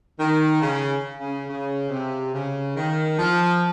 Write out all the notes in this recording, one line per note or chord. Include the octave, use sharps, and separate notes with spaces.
D#3
C#3
C#3
C#3
C3
C#3
D#3
F3